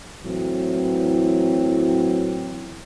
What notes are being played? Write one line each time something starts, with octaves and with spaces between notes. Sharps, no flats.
A2 E3 F#3 C4